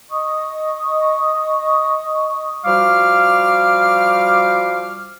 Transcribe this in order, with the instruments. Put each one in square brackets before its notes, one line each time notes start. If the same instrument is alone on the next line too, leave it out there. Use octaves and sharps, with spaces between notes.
[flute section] D#5 C#6 D#6
[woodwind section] F3 G3 F#4 F5 D6 F6